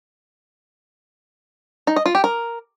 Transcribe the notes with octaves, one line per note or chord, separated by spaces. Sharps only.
D#4
D#5
F4
G4
A#4